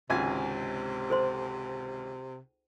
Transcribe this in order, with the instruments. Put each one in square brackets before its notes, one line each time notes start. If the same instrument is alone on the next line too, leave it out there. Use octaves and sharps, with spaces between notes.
[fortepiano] G#1 C#2 G#5 [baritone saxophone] C3
[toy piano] A4 C5 C6